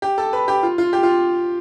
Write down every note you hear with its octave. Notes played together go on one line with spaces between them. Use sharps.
G4
A4
B4
G4
F4
F4
G4
F4